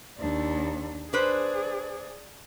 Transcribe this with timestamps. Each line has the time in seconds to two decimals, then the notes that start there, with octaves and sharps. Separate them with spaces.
0.18 D#2 D4
1.13 D4 G#4 B4 C5 D5